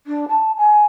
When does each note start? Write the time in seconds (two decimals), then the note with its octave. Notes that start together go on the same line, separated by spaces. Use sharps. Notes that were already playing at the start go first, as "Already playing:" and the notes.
0.06 D4
0.28 A5
0.57 G#5